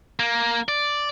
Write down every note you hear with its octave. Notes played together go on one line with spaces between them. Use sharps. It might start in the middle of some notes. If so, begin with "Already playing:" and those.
A#3
D5